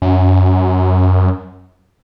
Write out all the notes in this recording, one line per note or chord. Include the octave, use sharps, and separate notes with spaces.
F#2